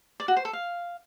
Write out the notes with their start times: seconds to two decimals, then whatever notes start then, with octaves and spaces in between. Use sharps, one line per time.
0.20 D5
0.28 F#4
0.36 C5
0.45 A4
0.53 F5